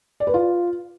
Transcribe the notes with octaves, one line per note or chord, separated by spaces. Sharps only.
D5
B4
F4